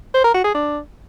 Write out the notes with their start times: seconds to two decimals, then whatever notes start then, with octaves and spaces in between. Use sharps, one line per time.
0.14 C5
0.24 A#4
0.34 F#4
0.44 G#4
0.54 D4